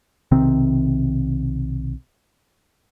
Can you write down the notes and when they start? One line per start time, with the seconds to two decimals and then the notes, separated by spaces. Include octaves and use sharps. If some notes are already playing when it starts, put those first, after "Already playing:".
0.31 B1 C3 D#3 C4